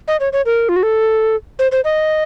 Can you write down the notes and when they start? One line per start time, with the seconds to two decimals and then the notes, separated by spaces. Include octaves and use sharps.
0.08 D#5
0.20 C#5
0.33 C#5
0.46 A#4
0.69 F4
0.76 F#4
0.83 A4
1.59 C5
1.72 C5
1.84 D#5